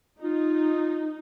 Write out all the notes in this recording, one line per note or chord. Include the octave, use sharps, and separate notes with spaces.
D#4 F4